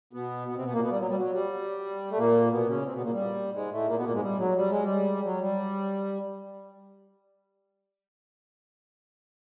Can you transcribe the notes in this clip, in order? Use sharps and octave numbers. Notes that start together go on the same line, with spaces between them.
B2 B3
B2 B3
C3 C4
B2 B3
A#2 A#3
B2 B3
G3
F#3
G3
F#3
G3
A3
A#2 A#3
B2 B3
C#3 C#4
C3 C4
B2 B3
A#2 A#3
G3
G#2 G#3
A2 A3
A#2 A#3
B2 B3
A#2 A#3
G#2 G#3
G3
F#3
G3
G#3
G3
F#3
G3